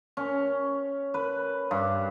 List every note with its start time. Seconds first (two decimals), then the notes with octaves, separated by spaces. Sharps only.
0.17 C#4
1.14 B4
1.71 G2